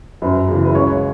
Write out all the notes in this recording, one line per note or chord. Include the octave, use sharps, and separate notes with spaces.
F#2 B4
C#3 E3
B4
C#2 C#5